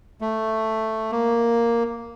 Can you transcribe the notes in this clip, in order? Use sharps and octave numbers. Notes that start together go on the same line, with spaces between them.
A3
A#3